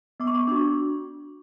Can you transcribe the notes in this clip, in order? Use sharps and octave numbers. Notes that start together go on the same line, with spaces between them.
B3 D6
C#6
D6
D4 F#4 C#6